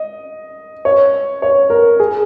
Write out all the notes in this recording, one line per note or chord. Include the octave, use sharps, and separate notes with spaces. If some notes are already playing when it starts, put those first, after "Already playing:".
Already playing: D#5
C#5
C#5
A#4
G#4